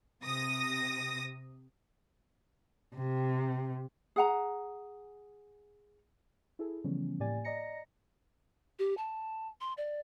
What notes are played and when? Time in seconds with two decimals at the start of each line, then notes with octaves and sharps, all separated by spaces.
0.23 C3 D#6 A#6
2.96 C3
4.16 G#4 F#5 A#5
6.59 E4 G#4 A4
6.84 C#3 E3 F3 G3 B3 C#4
7.20 A2 A#3 G4 D5 G#5 A6
7.45 D5 D#5 A#5 A#6 C#7
8.79 G4
8.97 A5
9.61 C6
9.77 D5